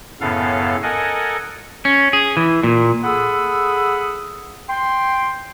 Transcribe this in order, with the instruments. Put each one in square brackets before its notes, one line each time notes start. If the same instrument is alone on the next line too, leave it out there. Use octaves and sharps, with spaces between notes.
[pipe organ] F#2 A2 C#3 B3 A4 F5
A4 A#4 D#5 F#5 G#5
[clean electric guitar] C#4
G#4
E3
A#2
[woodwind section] G#4 A4 F#5 B5 D#6 E6
G5 C6